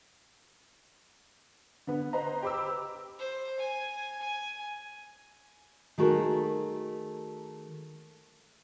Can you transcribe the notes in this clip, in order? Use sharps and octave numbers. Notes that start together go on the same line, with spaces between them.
D3 B3
B4 C5 D#5 A#5
G4 B5 D6 E6
C5
G#5
G#5
D#3 A3 F#4 G#4 A#4